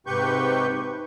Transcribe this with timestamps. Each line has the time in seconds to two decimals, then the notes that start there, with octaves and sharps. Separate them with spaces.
0.07 G#2 C3 G4 B4 C#6 G6